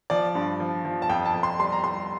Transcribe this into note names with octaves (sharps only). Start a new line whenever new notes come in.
F3 D5
G2
F3
F3
A5
F2 G5
A5
F2
C6
G3 C6
A#5
G3 C6